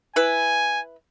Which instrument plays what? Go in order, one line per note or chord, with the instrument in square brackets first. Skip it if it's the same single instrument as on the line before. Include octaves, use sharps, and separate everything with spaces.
[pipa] E4 B4 [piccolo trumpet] G#5